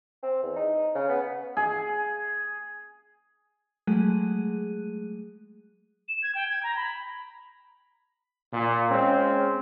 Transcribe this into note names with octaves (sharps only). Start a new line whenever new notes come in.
C4
E2
D#4
C#3
B3
G#4
F#3 G#3 A3 G#4 F#6 D#7
E7
G#6
G5
G#6
A#5
B5
A#2
G#3 C4 C#4